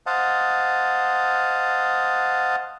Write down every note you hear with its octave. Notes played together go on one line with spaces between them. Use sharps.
C5 D#5 F5 F#5 A5